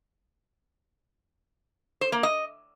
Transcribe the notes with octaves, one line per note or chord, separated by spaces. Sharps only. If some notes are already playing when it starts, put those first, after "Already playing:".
C5
A#3
D#5